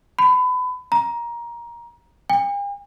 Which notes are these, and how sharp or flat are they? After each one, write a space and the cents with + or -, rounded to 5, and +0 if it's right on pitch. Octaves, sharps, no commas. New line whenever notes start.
B5 +30
A#5 +15
G5 +45